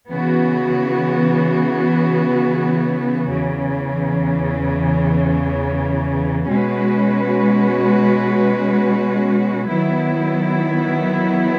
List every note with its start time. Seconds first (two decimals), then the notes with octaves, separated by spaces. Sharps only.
0.10 C#3 E3 B3 F#4
3.30 E2 C#3 E3
6.48 B2 G#3 C#4 F#4 B4
9.67 D#3 F#3 B3 E4